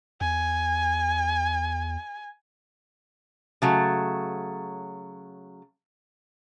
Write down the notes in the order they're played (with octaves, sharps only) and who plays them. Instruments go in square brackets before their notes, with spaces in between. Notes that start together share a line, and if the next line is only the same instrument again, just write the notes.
[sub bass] E2 [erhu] G#5
[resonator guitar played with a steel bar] C#3 F#3 A3